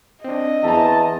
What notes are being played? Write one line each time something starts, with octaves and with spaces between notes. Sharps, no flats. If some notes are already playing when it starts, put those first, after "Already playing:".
C4 D4 D#5
E2 E5 A5 A#5